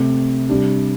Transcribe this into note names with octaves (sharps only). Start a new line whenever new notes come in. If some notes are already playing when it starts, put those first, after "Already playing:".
Already playing: C3 A3 C4
C3 G3 D4 G4